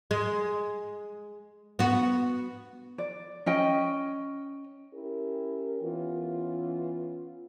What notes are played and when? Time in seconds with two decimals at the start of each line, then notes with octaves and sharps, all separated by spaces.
0.11 G#3
1.79 B3 F#4
2.98 D5
3.46 C#4 D#5 G5
4.94 C#4 E4 G4 A#4
5.82 E3 B3 C#4 F4